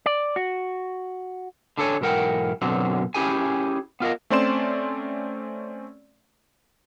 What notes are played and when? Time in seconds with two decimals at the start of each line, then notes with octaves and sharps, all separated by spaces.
0.06 D5
0.36 F#4
1.77 D3 D4 A4 C#5 G#5
2.01 B1 G#2 E3 A#4 F#5 G5
2.62 F#2 B2 D3 F#3 C4
3.14 C#4 D#4 E4 G4 G#4 G#5
4.00 B3 F4 A#4 D#5
4.30 A3 C4 C#4 D5 C6 E7